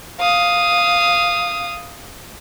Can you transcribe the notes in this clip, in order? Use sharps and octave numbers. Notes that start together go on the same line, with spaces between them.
F5 D#6